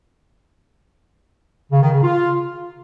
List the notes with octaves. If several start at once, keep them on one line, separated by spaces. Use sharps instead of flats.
C#3
D#3
C#3
F4